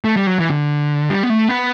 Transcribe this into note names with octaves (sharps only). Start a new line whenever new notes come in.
A3
G3
F#3
E3
D3
G3
B3
A3
B3